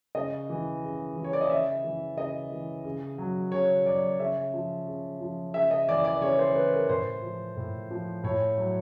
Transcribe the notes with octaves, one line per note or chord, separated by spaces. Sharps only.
C#3 D#5
E3
C#3
E3
C#5
D5
D#5
C#3 E5
E3
C#3 D#5
E3
C#3
F#3
C#3 C#5
F#3 D5
C#3 E5
F3
C#3
F3
C#3 E5
D#5
E3 D5
D5
C#3 C#5
C5
E3 B4
A#4
A2 C5
F3
A2
F3
A2 C#5
F#3